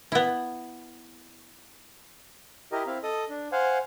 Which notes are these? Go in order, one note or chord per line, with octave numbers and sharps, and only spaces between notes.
B3 E4
E4 G4 A#4 D#5
C4 E4 F5
A4 D#5 D#6
D4
C5 F5 F#5 G#5